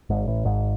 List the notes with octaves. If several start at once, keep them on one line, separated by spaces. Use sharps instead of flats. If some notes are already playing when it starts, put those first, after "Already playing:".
G#1 G#2
A1 A2
G#1 G#2